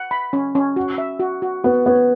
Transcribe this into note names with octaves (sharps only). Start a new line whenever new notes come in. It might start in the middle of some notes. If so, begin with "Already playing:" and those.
Already playing: F#5
B5
C#4
C#4
F#4
E5
F#4
F#4
B3 F#4
B3 C#5